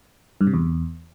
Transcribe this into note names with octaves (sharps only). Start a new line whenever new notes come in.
G2
C3
E2